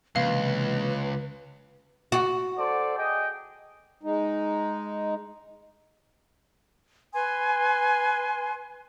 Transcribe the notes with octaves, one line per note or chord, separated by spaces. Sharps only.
C#2 C3 E3 A#3 B4 F5
F#4
A4 C5 D5
G#4 D#5 G5
G#3 D#4
B4 G#5 C6